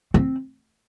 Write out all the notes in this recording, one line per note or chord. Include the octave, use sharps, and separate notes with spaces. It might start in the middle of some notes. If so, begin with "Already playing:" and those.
C4